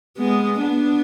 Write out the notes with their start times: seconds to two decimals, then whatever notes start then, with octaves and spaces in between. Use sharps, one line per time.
0.18 G#3 B3
0.60 B3 D4